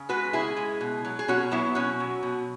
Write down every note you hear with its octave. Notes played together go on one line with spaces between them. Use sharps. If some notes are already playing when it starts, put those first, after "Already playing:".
Already playing: C#3
G#3 F#4 B4
C#3 E4 G#4
G#3
B2
F#3
G#4
B2 C#4 F#4
F#3 B3 E4
B2 C#4 F#4
F#3
B2